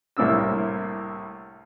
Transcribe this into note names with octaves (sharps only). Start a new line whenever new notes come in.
C2 A2 A#3 D4 E6